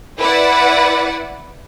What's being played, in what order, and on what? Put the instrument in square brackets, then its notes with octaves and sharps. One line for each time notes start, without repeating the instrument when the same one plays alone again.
[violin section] E4 B4 D5 F#5